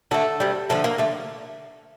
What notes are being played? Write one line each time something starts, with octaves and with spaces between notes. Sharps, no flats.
D3 A3 A4
C3 G3
D3 F3 A3 A4
A#3
D3 A3